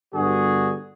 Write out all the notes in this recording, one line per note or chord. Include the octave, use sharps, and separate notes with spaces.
G2 D3 B3 F#4 G#4